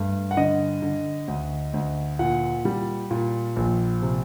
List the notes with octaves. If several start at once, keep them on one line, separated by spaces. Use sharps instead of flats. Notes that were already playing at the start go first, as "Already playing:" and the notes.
Already playing: G2 A3
F#5
D3 D#5
D3
D2
D2
A#2 F#5
G3
A#2
A#1
C3